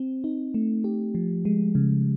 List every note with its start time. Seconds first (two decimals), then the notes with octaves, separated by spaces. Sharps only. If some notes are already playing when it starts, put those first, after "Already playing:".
Already playing: C4
0.24 D#4
0.54 A3
0.84 G4
1.15 F3
1.45 G#3
1.75 C#3